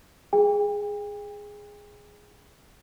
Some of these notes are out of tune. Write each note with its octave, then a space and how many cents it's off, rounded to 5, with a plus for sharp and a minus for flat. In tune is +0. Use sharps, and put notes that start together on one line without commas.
G#4 +0 G5 +40